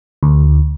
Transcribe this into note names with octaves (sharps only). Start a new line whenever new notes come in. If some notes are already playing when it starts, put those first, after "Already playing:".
D2